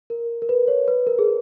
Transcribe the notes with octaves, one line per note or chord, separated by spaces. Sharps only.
A#4
A#4
B4
C#5
B4
A#4
G#4